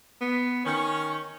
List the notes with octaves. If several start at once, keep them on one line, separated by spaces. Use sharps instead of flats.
B3
D#3 C#4